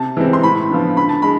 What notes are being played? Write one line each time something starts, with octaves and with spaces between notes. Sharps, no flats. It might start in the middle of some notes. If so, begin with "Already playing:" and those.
Already playing: C3 A5
E3 G#3 C4
C6
A2 B5
F3 B3 D4
D3 B5
A5
G#3 B5